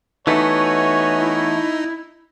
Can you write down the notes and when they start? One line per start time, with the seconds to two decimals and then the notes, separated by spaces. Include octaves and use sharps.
0.27 E3 A3 B3 D#4 F#4 C#5 G#5
1.20 E4